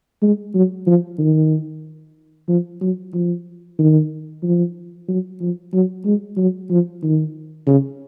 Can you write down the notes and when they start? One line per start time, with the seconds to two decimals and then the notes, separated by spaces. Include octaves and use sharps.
0.22 G#3
0.55 F#3
0.87 F3
1.19 D#3
2.48 F3
2.81 F#3
3.13 F3
3.79 D#3
4.43 F3
5.08 F#3
5.41 F3
5.74 F#3
6.05 G#3
6.37 F#3
6.71 F3
7.03 D#3
7.67 C#3